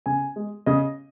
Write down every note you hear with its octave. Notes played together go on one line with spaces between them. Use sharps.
C#3 G#5
G#3
C#3 D#5